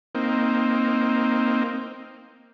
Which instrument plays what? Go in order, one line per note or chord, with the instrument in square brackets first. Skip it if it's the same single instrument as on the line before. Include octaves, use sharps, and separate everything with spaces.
[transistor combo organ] A#3 C4 D#4